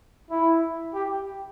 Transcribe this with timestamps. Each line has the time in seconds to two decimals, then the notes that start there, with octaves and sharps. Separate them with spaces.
0.30 E4
0.94 G4